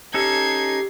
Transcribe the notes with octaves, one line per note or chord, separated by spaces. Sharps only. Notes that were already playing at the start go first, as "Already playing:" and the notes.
C#4 D#4 G4 A4 G#6 C7